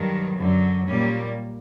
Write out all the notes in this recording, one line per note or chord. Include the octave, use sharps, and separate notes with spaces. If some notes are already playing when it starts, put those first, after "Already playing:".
Already playing: G2 D#3 F#3
F#2 D3 F#3
A#2 G3 A#3 C#4